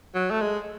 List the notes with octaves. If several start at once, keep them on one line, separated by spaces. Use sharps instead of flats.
F#3
A3
G#3